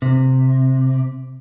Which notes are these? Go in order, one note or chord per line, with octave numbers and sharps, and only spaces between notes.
C3